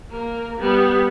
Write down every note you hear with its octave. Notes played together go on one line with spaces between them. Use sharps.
A#3 A#4
G3 B3